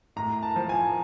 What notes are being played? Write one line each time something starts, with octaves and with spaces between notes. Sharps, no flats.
A2 A#5
A5
F3
G#5